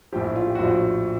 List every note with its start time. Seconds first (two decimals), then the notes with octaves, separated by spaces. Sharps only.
0.12 F3 G4
0.15 A#1 A2
0.24 E4
0.36 F4
0.47 G4
0.55 F#4
0.59 A#1 A2 F3 F4
0.70 F#4